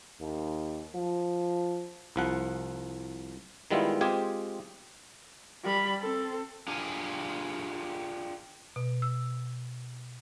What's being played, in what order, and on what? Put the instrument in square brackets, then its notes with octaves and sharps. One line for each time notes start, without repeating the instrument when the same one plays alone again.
[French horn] D#2
F3
[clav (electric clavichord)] C2 F3 F#5
D#3 G3 G#3 B3 E4 F4
G#3 C4 F4 G4 G#4 G#5
[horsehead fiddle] G3 B5
C4 A4
[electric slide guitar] D4 F4 G4 G#4 G#5
[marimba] B2
E6